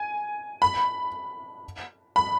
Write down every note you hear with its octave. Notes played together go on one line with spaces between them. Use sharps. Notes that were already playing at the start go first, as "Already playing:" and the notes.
Already playing: G#5
B5
B5